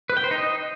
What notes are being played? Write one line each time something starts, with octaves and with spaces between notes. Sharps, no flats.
B4
G5
C5
D#4
D#5